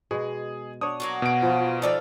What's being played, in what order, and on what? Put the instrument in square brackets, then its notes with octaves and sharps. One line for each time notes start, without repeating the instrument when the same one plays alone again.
[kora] B2 G#3 [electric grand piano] G#4
[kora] D4 C#5 F#5 [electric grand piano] D#6
[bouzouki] F#3 A#3 F#4
[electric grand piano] B2 D7
[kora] F3 B4 F#5 [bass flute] F4
[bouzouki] D3 G4 F5 [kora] F3 D#4 [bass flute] D5